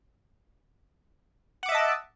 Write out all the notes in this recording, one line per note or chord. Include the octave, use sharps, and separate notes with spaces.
D#5 E5 F#5 A5 D6